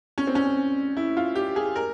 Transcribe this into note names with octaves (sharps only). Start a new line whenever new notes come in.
C#4
C4
C#4
E4
F4
G4
G#4
A#4